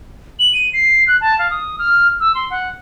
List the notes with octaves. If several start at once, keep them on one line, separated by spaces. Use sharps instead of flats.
F#7
D#7
C7
F#6
A5
F5
D#6
F6
E6
C6
F#5